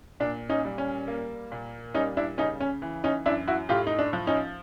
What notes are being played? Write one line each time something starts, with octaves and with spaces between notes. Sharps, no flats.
A#2 D4
C#4 D#4
G3
C#4
A#3
A#2
G3 C#4 D#4
D4 E4
C#3 C#4 D#4
C#4
E3
C#4 D#4
F#2 D4 E4
E4 F#4
A2 F4 G4
D#4
D4
F3
C#4 D#4